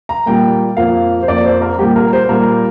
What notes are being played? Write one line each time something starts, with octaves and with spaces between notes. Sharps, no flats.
A#5
A#2 G3 A#3 G5
F2 F3 A#3 F5
C5
F2 F3 A#3 D5
C5
A#4
A#2 G3 A#3 G4
A#4
C5
C5
A#2 G3 A#3 A#4